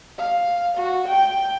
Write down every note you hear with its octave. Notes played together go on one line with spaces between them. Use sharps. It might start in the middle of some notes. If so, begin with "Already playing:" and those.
F5
F#4
G5